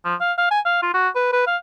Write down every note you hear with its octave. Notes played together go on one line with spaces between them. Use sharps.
F3
F5
F5
G#5
F5
F4
F#4
B4
B4
F5